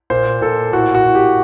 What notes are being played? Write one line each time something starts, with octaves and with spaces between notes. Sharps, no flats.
A#2 C5
A#2 A4
A2 F#4
F#4
A2
G4